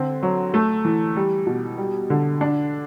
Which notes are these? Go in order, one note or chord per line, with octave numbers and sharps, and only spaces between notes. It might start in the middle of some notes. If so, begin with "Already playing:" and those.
Already playing: D3 C4
F#3
A3
E3
G3
B2
G3
D3
D4